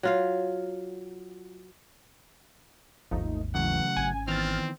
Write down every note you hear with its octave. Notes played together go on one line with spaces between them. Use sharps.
F#3 F4 F5
G#1 D#2 G#2 F3 A3 D#4
C#3 E3 F#3 A3 F#5
G#1 C#4 G#5
D#3 E3 B3 C4 F6 A6